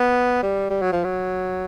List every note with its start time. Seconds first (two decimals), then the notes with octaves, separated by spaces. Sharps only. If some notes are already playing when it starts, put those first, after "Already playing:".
Already playing: B3
0.43 G3
0.70 G3
0.82 F#3
0.92 F3
1.04 F#3